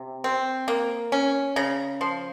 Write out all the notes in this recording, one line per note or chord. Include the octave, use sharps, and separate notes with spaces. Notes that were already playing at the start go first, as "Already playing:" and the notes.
Already playing: C3
C4
A#3
C#4
C#3 A#5
F3 C6